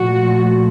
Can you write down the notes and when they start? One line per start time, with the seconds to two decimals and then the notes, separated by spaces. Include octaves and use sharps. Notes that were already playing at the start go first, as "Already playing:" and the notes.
Already playing: A#2 F3 A3 F#4